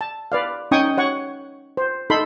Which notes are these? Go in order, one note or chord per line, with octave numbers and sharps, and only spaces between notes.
A5
B4 D5 F5
C#4 D#4 G5 G#5 C#6 D#6
C#5 F#5 C#6
C5
D#4 A4 B5 C6